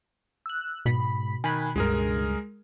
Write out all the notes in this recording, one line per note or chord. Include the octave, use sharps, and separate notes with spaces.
E6 F#6
G#2 B2 B5
D#3 G#5 B5 F#6
C#2 G2 G#3 G#4 A#4